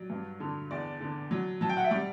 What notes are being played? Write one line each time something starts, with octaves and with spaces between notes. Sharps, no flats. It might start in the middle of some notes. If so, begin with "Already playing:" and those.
Already playing: F#3 D5
G2
D3
E2 D5
D3
F#3
F#3 A5
G5
F#5
E5
G3 D5